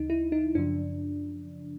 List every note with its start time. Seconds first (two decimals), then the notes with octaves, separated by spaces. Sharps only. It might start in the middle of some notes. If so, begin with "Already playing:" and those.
Already playing: D2 C#3 E3 D#4
0.10 E4
0.32 D#4
0.55 F#2 C#3 F3 D4